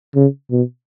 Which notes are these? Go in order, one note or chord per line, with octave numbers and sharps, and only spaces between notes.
C#3
B2